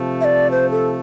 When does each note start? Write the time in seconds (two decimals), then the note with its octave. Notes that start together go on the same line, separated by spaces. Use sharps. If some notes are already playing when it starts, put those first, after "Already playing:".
Already playing: C3 F3 A3
0.21 E5
0.25 D5
0.51 C5
0.71 A4